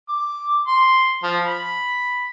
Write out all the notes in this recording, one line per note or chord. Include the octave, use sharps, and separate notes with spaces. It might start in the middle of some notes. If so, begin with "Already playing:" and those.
D6
C6
F3
B5